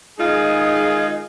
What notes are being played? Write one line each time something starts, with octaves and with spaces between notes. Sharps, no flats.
D#3 G#3 D#4 F4 G#4